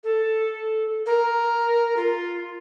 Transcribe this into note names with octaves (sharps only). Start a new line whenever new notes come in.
A4
A#4
F4